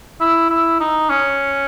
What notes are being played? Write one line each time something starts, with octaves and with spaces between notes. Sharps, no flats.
E4
E4
D#4
C#4